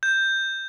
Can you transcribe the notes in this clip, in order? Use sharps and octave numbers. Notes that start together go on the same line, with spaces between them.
G6